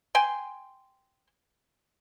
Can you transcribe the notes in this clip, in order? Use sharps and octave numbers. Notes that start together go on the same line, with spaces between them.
G5 G#5 C6